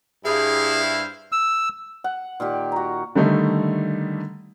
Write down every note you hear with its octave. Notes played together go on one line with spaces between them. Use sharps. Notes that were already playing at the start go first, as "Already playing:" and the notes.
G2 E4 G#4 C5 F5
E6
F#5
A#2 D#3 G4
F#4 A#5
D3 D#3 G3 A3 D#4